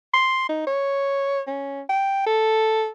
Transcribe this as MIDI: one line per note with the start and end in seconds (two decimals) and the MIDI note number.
0.14 0.49 84
0.49 0.62 63
0.67 1.41 73
1.47 1.81 61
1.89 2.22 79
2.26 2.88 69